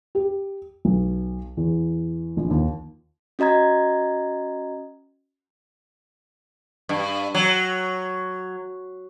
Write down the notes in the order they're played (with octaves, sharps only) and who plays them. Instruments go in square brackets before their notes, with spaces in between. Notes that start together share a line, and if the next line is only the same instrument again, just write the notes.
[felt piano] G4
B1
E2
A#1
D#2
[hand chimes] C#4 F#4 D#5 A#5 G#6
[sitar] G2
F#3